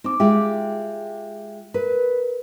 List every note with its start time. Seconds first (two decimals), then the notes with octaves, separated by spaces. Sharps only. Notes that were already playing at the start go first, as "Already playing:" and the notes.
0.04 C4 D#4 D6
0.20 G#3 F4 G4 E5 G5
1.74 A#4 B4